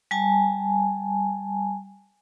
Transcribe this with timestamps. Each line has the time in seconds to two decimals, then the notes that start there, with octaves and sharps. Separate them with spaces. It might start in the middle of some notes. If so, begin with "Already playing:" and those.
0.11 G3 G#5 A5